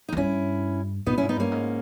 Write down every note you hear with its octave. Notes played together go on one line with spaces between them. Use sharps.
D#4
E2
G2 C#4 E4
A#2 B3 D#4
C#4 E4
G#2
B3 D#4
G2 A#3 C#4
G#2